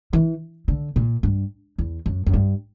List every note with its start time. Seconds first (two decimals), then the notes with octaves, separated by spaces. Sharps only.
0.13 E3
0.68 D3
0.96 A#2
1.23 G2
1.78 E2
2.06 F#2
2.26 F#2
2.33 G2